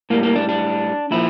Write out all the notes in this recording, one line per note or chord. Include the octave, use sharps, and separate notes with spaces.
A2 G3 A#3
A#3
D4
D4
A#2 F3 E4